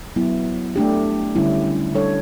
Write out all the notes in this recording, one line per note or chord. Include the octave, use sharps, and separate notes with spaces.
F#3 B3 E4
A3 D4 G4
D3 G3 C#4 E4
G3 D4 A4 C#5